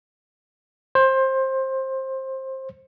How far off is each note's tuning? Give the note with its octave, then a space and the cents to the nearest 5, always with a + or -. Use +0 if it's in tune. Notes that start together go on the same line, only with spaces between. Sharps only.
C5 +20